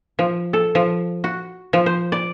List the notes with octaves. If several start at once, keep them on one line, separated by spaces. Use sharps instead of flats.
F3
A4
F3
F#4
F3
C5
D5